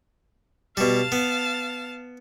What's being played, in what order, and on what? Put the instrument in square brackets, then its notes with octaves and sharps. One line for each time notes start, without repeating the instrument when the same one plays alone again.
[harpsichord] B2 G3 [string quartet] F5 A5 A6
[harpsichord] B3